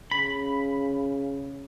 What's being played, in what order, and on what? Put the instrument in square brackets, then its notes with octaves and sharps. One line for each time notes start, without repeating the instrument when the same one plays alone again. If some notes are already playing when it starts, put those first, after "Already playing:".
[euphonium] C#3 [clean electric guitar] B5